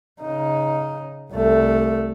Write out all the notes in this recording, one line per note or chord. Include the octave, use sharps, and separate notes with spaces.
C#3 D#4
C2 A3